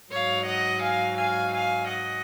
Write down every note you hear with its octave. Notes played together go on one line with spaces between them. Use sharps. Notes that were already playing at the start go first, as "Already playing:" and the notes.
G#2 F#3 C#5 F5
D#5 F#5
F5 G#5
F5 G#5
F5 G#5
D#5 F#5